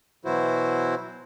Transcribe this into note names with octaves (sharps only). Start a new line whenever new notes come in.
B2 E3 F#3 E4 F#4 C5